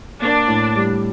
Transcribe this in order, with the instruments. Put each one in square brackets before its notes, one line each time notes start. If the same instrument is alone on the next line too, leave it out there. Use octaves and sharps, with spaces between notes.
[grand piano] A#3 [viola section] D4
[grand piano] A2
G3